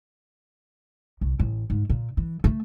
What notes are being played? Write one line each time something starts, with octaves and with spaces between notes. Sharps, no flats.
C2
A1
G#2
A#2
E3
A3